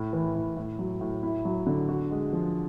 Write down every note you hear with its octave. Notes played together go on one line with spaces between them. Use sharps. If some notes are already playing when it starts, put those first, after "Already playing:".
Already playing: A2
E3
A2
A2
F#3
A2
E4
F#3
D3
F#4
G#3
F3